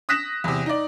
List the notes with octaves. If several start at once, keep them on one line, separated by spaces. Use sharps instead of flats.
D#6 F#6 A#6 B6 E7
E2 C3
D#4 D5